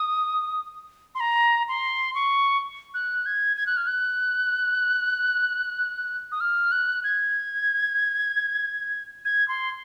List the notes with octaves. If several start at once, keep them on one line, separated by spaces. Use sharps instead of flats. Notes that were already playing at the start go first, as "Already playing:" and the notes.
Already playing: D#6
C6
A#5
C6
C#6
F#6
G#6
G#6
F#6
F6
F#6
D#6
F6
F#6
G#6
G#6
C6